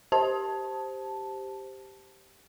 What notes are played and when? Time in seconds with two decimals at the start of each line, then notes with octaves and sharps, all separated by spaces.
0.12 G4 C5 A5